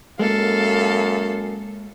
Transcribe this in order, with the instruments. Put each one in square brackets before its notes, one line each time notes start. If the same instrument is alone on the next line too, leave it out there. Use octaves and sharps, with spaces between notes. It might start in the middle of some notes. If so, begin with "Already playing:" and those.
[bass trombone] F#2 [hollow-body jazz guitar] G#3 A#3 [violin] A4 F5